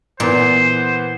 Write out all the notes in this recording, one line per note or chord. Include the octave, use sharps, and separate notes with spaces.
A#2 E3 B3 C5 G6